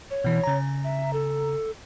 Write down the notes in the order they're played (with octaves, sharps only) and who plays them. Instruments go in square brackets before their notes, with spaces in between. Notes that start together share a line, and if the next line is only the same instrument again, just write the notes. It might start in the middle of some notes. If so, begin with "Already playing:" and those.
[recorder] C#5
[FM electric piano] B2 E3
C#3 A#5
[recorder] E5
A4